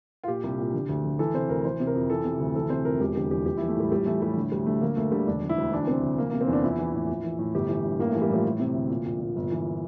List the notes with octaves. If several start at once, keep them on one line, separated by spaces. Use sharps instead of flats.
F4
A#2 G4
C2
A#2
D3
D2
D3
E3 A4
C3 C5
D2 A#4
E3 C5
C3
A#4
F2
E3 A4
C3
D2
E3 A4
C3 C5
F2 A#4
E1 G4
D3 G4
E2 G4
A#1 G4
E3 E4
A3
A2 G3
A#1 G3
E3 A3
A2 G3
D3
D2 G3
D3 A3
D3 A#3
D2 A3
D3 G3
E1 D4
D3
E4
D2
E3 D4
C3 C4
D2
E3 A#3
C3 A#3
C4
E2 D4
A#1 E4
E3
A2
A#1
E3
A2
G1 G4
E3
G2
A1 A#3
E3 A3
G3
A2 F3
E3
C3
D2
A#2
A#1
A#2
G1
E3